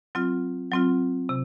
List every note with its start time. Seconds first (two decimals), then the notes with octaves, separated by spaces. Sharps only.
0.15 F#3 C4 F4
0.71 F#3 C4 F4
1.29 C3